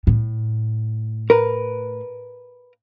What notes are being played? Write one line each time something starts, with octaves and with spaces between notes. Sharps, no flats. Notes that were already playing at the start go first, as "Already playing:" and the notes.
A2
A#4 B4